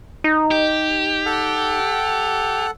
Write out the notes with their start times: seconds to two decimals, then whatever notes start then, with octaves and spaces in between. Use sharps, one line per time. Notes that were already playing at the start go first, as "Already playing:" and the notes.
0.24 D#4
0.51 G4
1.26 A4 F#5